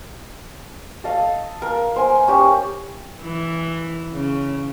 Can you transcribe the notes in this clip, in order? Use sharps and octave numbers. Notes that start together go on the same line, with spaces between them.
A4 D#5 F5
A#4
C5 G#5
C#4 G4
E3
C#3